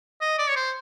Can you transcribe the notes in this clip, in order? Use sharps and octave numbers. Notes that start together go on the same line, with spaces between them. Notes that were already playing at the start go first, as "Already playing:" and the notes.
D#5
D5
C#5
C5